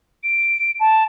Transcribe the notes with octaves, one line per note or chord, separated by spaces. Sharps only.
D7
A5